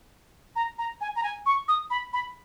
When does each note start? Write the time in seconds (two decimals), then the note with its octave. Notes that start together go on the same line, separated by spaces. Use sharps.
0.56 A#5
0.78 A#5
1.01 G#5
1.16 A#5
1.23 G#5
1.46 C#6
1.68 D#6
1.90 B5
2.13 B5